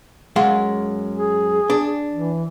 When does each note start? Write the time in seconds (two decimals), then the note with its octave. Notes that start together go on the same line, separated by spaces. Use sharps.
0.36 F#2 G#3 F5
1.14 G#4
1.70 D4
2.13 E3